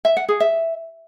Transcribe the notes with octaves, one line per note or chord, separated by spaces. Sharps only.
E5
F#5
G#4
E5